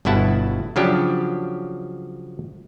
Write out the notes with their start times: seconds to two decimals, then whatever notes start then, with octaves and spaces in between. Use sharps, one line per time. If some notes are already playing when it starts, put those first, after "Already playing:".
0.05 G1 G2 B2 E4 F#5 A5
0.76 C#3 F3 F#3 D4 G4